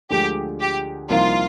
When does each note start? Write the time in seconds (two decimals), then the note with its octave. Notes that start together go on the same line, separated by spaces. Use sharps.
0.10 D2 D3 F3 G#3 G4
0.60 G4
1.09 C2 C3 F3 A#3 D#4 F4